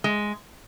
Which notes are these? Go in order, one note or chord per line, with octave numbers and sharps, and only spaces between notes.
G#3